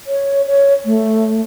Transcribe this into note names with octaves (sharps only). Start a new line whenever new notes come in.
C#5
C#5
A3